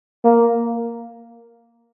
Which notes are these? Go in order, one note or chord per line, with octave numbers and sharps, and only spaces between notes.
A#3